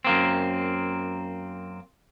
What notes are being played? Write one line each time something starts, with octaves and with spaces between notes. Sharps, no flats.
F#2 A#3 C4